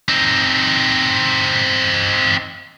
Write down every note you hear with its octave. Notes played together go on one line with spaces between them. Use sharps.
C4 D#4